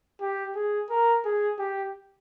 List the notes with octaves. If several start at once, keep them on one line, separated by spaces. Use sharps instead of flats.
G4
G#4
A#4
G#4
G4